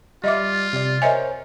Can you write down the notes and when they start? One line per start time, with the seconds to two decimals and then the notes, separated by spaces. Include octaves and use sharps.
0.24 G3 F4 D#5 E5 D6
0.73 C3 D5
1.02 A#4 C5 C#5 D#5 E5 G#5